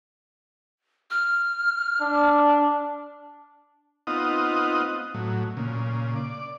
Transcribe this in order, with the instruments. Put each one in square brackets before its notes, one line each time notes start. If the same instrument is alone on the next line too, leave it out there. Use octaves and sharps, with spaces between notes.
[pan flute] F6
[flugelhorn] D4
[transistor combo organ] B3 C4 D#4 F4 D#5 F#5
A2 F#3
A#2 C#3
D5